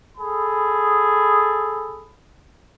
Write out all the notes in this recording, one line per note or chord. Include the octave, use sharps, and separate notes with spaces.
G#4 A4 B5